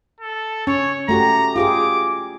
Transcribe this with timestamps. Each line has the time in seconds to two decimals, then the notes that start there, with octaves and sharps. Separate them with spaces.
0.20 A4
0.67 C#4 C#5
1.09 A3 F#4 G4 A#5
1.56 F4 G4 G#4 D6